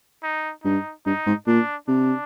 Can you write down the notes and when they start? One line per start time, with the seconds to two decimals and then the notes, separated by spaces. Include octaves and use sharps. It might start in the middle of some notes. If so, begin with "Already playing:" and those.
0.23 D#4
0.64 G2 D#4
1.06 G2 D#4
1.26 G#2
1.47 A#2 D4
1.88 C3 D4